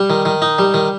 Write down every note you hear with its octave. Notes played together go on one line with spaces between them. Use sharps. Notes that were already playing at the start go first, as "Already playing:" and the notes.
Already playing: G3
D#3
D#3
D#4
G3
D#3